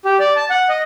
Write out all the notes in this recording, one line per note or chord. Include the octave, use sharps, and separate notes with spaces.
G4
D5
A5
F#5
D#5